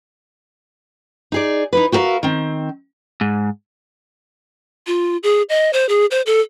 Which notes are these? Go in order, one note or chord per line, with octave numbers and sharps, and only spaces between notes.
D#4 G#4 D5
D#4 E4 B4
F#4 G4 A#4 B4 E5 F5
D#3 C4
G#2
F4
G#4
D#5
C5
G#4
C5
A4